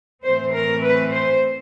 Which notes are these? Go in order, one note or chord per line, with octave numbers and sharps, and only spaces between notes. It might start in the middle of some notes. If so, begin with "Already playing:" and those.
A2 E3 A3 C4 C5
A#4
B4
C5